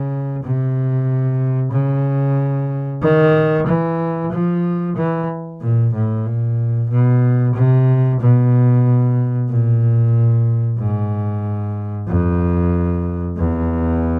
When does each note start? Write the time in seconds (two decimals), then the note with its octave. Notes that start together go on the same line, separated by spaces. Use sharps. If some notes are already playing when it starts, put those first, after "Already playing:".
Already playing: C#3
0.44 C3
1.72 C#3
3.02 D#3
3.67 E3
4.31 F3
4.96 E3
5.61 A#2
5.94 A2
6.26 A#2
6.89 B2
7.55 C3
8.20 B2
9.49 A#2
10.79 G#2
12.07 F2
13.37 E2